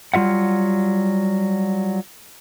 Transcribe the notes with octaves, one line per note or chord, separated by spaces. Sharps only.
F#3 G3 F4 E5 F#5